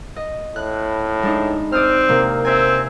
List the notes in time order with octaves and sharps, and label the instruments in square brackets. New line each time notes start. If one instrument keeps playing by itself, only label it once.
[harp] D#5
[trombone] A2 [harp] F#6
[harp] G#3 D4 D#4
[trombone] C4 [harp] D5 D#6 F6
[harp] C3 A#3
[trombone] C4 [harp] E5 G#5